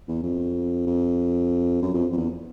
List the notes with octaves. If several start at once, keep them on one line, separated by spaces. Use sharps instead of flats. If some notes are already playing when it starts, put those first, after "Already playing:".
E2
F2
F2
F#2
F2
F2
E2